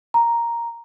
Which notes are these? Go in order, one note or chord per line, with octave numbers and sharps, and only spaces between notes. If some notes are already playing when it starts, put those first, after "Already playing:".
A#5